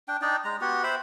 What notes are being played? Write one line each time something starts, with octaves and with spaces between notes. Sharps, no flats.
D4 G5
D4 D#4 D5 G5
G#3 A#5
B3 F#4 G4
C5 E5 G5 B5